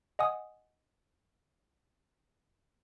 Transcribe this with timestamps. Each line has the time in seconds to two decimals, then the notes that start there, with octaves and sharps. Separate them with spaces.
0.19 D#5 F#5 G#5 D#6